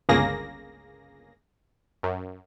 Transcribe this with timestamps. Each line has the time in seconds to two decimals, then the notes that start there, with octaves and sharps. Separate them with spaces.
0.09 G1 C#2 C#3 A#3 G#4 A#6
2.03 F#2